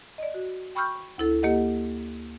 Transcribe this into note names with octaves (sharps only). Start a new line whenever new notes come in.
D5 D#5
F#4
G5 B5 C#6 E6 F6 G6
D2 E4 A4
A#3 G4 D#5 F#5